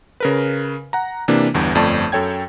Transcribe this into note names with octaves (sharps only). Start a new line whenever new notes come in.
C#3 A#4 B4
F#5 A#5
C3 E3 A#3 D4
G1 E2 G2
G1 F2 A3 D5 A5 C#6
F#2 A4 C#5 G5 G#6